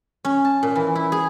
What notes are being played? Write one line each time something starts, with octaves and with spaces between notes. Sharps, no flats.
C#4
A5
A#2
E3
E4
G#4